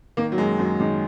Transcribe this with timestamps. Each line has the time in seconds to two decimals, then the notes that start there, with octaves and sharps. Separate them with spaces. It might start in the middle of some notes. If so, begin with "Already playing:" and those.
0.17 D#3 A#3
0.32 F#3
0.38 F#2 G#3
0.59 F#2 F#3
0.80 D#3 G#3